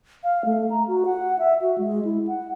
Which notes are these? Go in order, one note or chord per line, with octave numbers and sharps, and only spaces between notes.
F5
A3
A#5
F#4
F#5
E5
F#4
G#3
E4
F#5